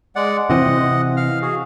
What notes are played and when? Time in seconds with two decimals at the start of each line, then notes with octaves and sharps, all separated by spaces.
0.16 G#3 D5 F#5
0.50 C3 E3 C4 D#5 F#5
1.17 F5 F6
1.42 F#4 G#4